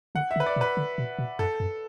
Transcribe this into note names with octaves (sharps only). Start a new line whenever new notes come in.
D3 F#5
E5
D3
B4
D5
B2
B4
D3
B2
B2
F#2 A4
F#2